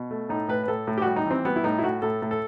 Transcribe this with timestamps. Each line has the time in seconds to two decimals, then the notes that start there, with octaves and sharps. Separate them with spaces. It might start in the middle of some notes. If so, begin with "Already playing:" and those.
Already playing: B2
0.11 A3
0.29 A2 D#4
0.49 A2 B4
0.64 B4
0.68 A2 A4
0.87 A2
0.98 G4
1.02 G3 F#4
1.16 D#4
1.26 E3 C4
1.45 G3 B3
1.56 E4
1.64 A2 D#4
1.79 E4
1.83 A2 F#4
2.02 A2 A4
2.22 A2
2.31 A4